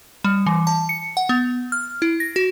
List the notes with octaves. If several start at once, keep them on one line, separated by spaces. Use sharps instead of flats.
G3
E3
A5
C#7
F#5
B3
F6
E4
A#6
F#4